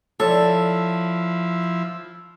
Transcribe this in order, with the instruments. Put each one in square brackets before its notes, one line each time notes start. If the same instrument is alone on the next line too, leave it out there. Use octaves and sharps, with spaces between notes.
[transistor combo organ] F3 E4 [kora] A4 [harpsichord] C#5 [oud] D5